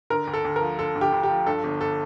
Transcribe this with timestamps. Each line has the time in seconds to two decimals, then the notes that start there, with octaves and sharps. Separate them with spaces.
0.10 D3 A#4
0.27 D2
0.33 A4
0.45 D2
0.56 A#4
0.61 F3
0.78 D3 A4
0.96 D2
1.01 G4
1.12 D2
1.23 G4
1.29 F3
1.46 G2 A4
1.64 G1
1.81 A4